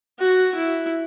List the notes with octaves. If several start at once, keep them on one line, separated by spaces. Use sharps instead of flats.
F#4
E4